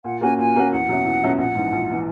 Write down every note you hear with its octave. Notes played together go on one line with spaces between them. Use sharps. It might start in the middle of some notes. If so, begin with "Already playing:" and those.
A#2 F#5
A#3 C#4 F#4 G#5
A#2 G#5
A#3 C#4 F#4
E2 F#5
B2 F#3 C#4 E4
E2
B2 F#3 C#4 E4
A#1 F#5
G#2 E3
A#1
E3